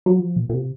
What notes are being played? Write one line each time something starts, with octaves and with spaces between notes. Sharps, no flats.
F#3
F3
A#2
A#2
C3